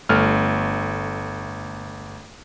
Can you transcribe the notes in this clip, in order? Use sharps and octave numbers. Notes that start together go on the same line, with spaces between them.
G1 A3 F6